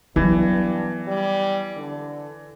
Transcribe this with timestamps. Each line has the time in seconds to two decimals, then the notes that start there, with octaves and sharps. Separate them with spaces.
0.16 G2 E3 F#3 B3
1.07 G3
1.77 D3